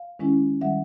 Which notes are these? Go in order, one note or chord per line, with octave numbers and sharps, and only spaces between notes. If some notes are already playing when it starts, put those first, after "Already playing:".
Already playing: F5
D#3 G#3 C#4 E4
D#3 G3 E5 F#5